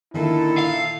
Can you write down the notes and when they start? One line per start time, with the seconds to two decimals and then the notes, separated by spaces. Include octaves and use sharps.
0.14 A#2 D3 D#3 A#3 E4 A4
0.59 F5